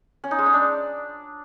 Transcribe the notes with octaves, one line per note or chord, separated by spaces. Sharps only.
C#4
D#4
G#3
D#4
D4